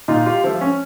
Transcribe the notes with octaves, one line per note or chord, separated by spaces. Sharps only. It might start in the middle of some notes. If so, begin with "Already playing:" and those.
A#2 D#4 F4
F4 G4
F3 A3
C#4